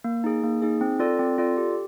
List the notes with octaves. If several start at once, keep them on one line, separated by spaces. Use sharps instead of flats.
A#3
D#4 G#4
A#3
D#4 G#4
C4
F4 A4 D5
C4
F4 A4 D5
G4